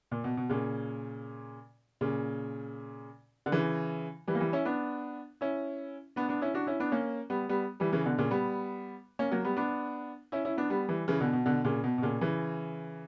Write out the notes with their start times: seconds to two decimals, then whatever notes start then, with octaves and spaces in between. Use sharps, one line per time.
0.11 A#2
0.24 B2
0.37 B2
0.49 A#2 C#3
2.01 A#2 C#3
3.46 D3
3.52 C#3 E3
4.28 E3 G3
4.35 A#3
4.40 E3 G3
4.53 C#4 E4
4.65 B3 D4
5.41 C#4 E4
6.16 B3 D4
6.29 B3 D4
6.41 C#4 E4
6.54 D4 F#4
6.67 C#4 E4
6.80 B3 D4
6.92 A#3 C#4
7.30 G3 B3
7.49 G3 B3
7.80 E3 G3
7.92 C#3 E3
8.05 B2 D3
8.18 A#2 C#3
8.31 G3 B3
9.19 A#3 C#4
9.31 F#3 A#3
9.45 G3 B3
9.57 B3 D4
10.32 C#4 E4
10.45 C#4 E4
10.57 B3 D4
10.70 G3 B3
10.89 E3 G3
11.08 C#3 E3
11.20 B2 D3
11.33 B2
11.46 B2 D3
11.64 A#2 C#3
11.84 B2
11.98 B2
12.02 A#2 C#3
12.21 C#3 E3